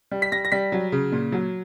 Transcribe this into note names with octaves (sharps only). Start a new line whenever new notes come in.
G3
B6
G3 A#6
A#6
G3 B6
F#3
C#3
A#2
F#3